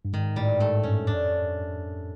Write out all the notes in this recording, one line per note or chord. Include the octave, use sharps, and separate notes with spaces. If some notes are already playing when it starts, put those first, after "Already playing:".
G2
G#2 D#3
A2 G3
G#2 A3
G2 C#4
F2 D4